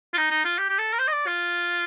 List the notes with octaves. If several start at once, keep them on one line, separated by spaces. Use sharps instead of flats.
F4
D#4
D#4
F4
G4
G4
A4
A#4
C5
D#5
D5
F4